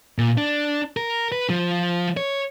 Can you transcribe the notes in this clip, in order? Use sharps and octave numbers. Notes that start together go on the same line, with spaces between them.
A#2
D4
A#4
B4
F3
C#5